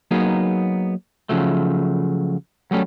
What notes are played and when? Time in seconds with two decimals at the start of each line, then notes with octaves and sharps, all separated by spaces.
0.11 F#3 A#3 B3 D#4 G#4
1.29 C#3 F3 F#3 A3
2.71 F#3 G3 A3 C#4